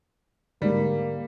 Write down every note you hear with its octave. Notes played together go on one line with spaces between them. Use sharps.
D2 G#2 G3 A#3